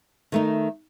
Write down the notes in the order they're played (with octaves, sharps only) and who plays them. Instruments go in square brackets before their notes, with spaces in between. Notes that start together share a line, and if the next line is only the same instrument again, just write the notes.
[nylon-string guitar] D#3 A3 D#4